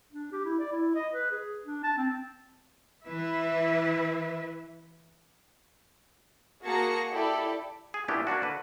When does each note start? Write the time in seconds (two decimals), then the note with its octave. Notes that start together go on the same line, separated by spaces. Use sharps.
0.13 D4
0.32 G4
0.45 E4
0.59 D5
0.72 E4
0.95 D#5
1.14 B4
1.31 G#4
1.65 D4
1.84 A5
1.97 C4
3.04 E3 E4 B4 E5
6.64 A#3 F#4 G#4 A5 A#6 C#7
7.12 E4 G4 A4 D5
7.94 G#4
8.08 A#2 B3 C#4 D4 E4 G4
8.27 A#3 C#4 D4 F#4
8.42 D3 B4